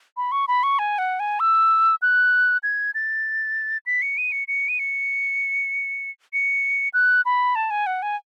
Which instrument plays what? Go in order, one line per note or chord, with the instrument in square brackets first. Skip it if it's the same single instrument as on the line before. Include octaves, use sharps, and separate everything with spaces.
[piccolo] B5
C#6
B5
C#6
G#5
F#5
G#5
E6
F#6
G#6
A6
B6
C#7
D#7
C#7
C#7
D#7
C#7
C#7
F#6
B5
A5
G#5
F#5
G#5